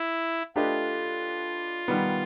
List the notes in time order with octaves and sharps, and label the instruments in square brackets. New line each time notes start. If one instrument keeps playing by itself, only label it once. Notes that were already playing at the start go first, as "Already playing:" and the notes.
Already playing: [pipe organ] E4
[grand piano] A3 D4 G4 B4 D#5 [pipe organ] F4
[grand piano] D#3 G3 B3